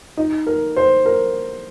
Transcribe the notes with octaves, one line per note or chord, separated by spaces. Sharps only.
D#4
A#4
C5
A#4